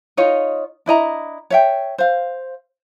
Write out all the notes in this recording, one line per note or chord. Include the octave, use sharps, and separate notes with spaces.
D#4 F4 C#5 D#5
D4 E4 D#5 A#5
C#5 E5 G5
C5 F5